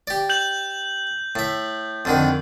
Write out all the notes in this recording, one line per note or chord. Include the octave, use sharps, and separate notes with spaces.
G4 D5
G6 F#7
A2 E5
F2 D3 D#3